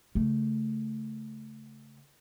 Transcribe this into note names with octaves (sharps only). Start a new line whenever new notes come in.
C#3 A3